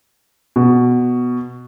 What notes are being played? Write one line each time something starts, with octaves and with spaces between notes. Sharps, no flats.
B2